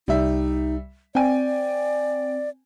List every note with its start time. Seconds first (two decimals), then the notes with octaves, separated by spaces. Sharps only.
0.08 C2 G3 D#4 E5
1.15 C4 D5 G5 G#5